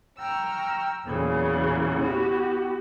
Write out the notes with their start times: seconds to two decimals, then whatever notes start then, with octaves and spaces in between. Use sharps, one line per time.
0.20 G5 A#5 C#6 E6 F6
1.05 E2 A#2 C#3 E3 F#3
1.97 B3 E4 F#4 G4